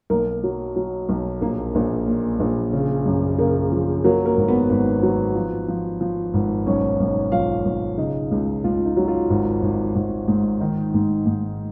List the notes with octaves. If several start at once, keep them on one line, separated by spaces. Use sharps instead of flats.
B1 A#3 A#4
F#3
F#3
B1
A#1 A#3 A#4
A#1
A#2
A#1
C#3
F#2
C#3 A#3 A#4
F3
F#3 A#3 A#4
A#3 A#4
G#1
B3 B4
G#1 B3 B4
F#3
F3
F3
F3
G#1
B1 C#4 C#5
B1
B1 F4 F5
B1
C#3 D#4 D#5
C#2
C#2 F4
D#4
F#3
F4
G#1
G#1
G#1
G#2
D#3 D#4
G#2
G#2